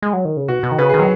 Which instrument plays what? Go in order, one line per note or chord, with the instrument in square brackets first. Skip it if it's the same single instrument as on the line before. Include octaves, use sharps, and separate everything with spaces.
[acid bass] G#3
F#3
D#3
C#3
[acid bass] B2 [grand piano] F#4
[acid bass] B2
D#3
[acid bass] C#3 [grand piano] B4
[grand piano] G#4
[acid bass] D#3
[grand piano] F#3